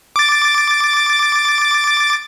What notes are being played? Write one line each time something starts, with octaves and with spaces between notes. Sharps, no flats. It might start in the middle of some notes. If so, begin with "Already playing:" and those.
D6 A6